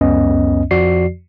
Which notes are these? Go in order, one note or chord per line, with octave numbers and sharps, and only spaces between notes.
C#2 F#2 B3 C#4 D#5
F2 F3 F#4 D5 C7